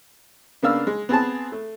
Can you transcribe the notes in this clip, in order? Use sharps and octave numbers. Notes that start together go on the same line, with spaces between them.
C#3 A#3 B3 D4 F5 E6
G#3
B3 C4 G#4 A5
A3